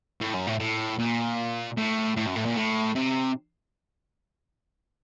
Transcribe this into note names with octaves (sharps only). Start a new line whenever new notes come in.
A2
F#2
A2
A2
A#2
A2
A2
F#2
A2
A#2
A2
C3